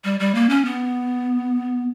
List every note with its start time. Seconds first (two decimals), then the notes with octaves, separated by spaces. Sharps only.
0.04 G3
0.20 G3
0.35 A#3
0.49 C#4
0.65 B3